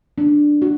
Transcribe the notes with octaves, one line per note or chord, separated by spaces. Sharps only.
D4
F#4